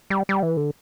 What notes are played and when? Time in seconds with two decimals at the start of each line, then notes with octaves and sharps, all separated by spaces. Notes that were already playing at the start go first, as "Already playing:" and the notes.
0.10 G3
0.29 G3
0.43 E3
0.57 D3